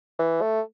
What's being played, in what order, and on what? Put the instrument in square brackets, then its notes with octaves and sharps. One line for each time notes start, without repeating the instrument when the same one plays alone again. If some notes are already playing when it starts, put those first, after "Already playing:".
[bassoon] E3
A3